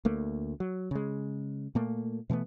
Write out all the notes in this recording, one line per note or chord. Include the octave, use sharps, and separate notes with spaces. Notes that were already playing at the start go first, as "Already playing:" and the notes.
D2 A3 A#3
F#3
C#3 G#3
A#2 A3 A#3
B2 E3 A3 B3